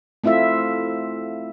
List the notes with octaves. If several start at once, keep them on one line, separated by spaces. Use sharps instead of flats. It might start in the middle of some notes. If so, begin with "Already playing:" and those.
A3 C4 E4 F4 E5